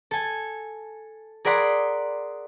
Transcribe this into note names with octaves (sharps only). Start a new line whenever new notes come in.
A4 G#5
G#4 A#4 D5 F#5 B5 C6